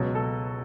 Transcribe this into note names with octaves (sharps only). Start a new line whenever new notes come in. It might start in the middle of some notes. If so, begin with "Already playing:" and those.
Already playing: C#2 B2 F#3
A4